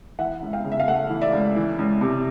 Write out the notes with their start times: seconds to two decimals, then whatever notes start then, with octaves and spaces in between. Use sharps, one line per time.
0.19 E3 E5 F#5
0.42 C#2
0.53 F5 G5
0.65 C#3
0.72 E5
0.80 F5
0.87 A3 E5 F#5
1.10 E3
1.21 D5 E5
1.33 C#2
1.56 E3
1.79 C#2
2.01 C3